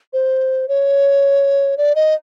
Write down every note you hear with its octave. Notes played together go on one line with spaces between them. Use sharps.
C5
C#5
D5
D#5